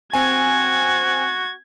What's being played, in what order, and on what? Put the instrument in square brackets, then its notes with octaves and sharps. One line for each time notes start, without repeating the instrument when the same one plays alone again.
[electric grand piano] C4 G#5 [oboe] F#4 [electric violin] G#6